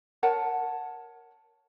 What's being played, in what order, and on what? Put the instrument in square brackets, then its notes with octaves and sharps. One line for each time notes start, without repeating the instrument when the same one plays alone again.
[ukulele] A#4 C#5 F#5 A5